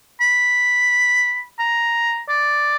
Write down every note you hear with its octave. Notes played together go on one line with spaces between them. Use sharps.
B5
A#5
D5